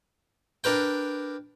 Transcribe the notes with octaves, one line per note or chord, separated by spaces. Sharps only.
D4 A#4 B4 G5